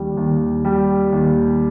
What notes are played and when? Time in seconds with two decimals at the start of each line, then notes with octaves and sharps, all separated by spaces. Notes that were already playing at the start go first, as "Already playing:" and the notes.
Already playing: D#2 G3
0.17 D#2
0.65 G3
1.12 D#2